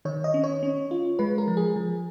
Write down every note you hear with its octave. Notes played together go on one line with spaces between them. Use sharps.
D#3 C#5
D#5
C#4
C#5
C#4
F4
G#3 B4
A#4
F3
G#4
F3